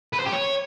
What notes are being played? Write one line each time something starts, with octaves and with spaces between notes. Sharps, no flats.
B4
C5
G4
C#5